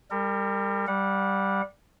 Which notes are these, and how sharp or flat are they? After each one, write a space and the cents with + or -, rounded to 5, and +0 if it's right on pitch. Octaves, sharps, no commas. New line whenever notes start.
G3 +25 A#4 -35
G3 -5 F#5 -30